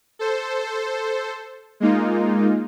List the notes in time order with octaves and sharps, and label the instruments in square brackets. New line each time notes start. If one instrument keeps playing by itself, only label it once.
[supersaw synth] A4 C5
G#3 A#3 D#4 F4